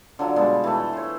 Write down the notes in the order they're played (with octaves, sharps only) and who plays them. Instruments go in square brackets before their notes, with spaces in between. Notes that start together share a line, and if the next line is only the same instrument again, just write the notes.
[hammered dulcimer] D3 F#3 F4
B2 G3 G#3 A5
E3 A3
C5 C#5